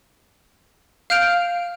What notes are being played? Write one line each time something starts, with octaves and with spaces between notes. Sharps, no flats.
F5 F6 G6 D7 F7